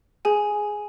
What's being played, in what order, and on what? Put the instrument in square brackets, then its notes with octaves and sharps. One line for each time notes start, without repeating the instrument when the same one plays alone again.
[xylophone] G#4 G#5